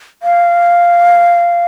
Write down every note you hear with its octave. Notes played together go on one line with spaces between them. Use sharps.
F5